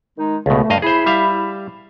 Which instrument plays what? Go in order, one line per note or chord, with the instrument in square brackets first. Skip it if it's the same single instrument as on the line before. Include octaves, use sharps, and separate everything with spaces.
[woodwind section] D#3 G#3 D#4
[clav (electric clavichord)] C#2 B2 [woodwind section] A3
[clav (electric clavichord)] G2 D#5 F5
[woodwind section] E4 B5 [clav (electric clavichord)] G#4 C5
[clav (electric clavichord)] G3 E5 F5